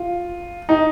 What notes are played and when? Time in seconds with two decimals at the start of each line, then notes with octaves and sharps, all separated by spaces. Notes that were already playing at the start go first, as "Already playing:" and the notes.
Already playing: F4
0.69 D#4